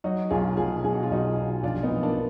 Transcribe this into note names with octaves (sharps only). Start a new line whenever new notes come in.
F#3 D#4 F#4
B1 F4 G#4
B2 F4 G#4
B1 G#4
F#4
F4
B1 D#4 F#4
B1
A#1 D4 F4
B3 D#4
A#1
A#3 D4